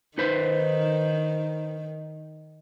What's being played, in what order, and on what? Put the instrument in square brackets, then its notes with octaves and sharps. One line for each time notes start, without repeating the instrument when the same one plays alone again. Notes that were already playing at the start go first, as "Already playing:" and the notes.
[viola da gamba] D#3 [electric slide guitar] D#4 B4 C5